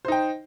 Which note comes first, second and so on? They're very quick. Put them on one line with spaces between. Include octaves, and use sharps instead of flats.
C5 D#4 G5